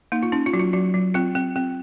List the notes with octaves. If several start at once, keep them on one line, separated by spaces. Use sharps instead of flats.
A#3 D#4
F4
C#4 D#4
F4
F#3 F#4
F4
F#3 F#4
F#3
C4 F4
C4
C4